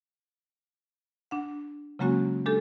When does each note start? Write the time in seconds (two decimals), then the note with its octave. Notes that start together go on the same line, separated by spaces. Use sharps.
1.31 D4 F#5
1.99 C#3 F#3 G#3 A#3 C#4 F#4
2.46 G#3 D4 G4 A4